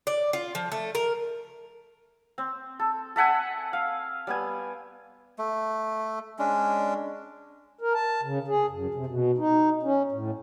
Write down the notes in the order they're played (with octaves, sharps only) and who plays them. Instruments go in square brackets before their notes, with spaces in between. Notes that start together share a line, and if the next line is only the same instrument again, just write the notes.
[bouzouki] D5
F4
F3
A3
A#4
[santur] C4
A4
A4 E5 F#5 G#5
F5
G3 B3 G#5
[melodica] A3
G#3 C#4 D4
[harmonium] A#4
A5
C#3
G#4
F#2
C3
B2
D#4
C#4
A2